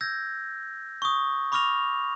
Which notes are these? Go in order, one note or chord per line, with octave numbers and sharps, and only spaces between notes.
E6 G6 G#6 A#6
C#6 D#6
B5 C#6 D6 F6 A#6 F7